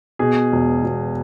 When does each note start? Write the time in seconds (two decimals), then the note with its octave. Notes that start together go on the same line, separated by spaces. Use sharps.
0.19 B2 G#4
0.52 E1
0.83 E1